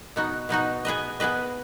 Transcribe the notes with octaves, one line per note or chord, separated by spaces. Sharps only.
B2 B3 D#4 F#4
B2 B3 D#4 F#4
B3 G#4 B4 D#5
B3 G#4 B4 D#5